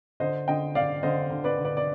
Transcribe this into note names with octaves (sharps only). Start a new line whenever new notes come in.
D3 C5 D#5
D3 D#5 G5
D3 D5 F5
D3 C5 D#5
D3
B4 D5
D3
B4 D5
D5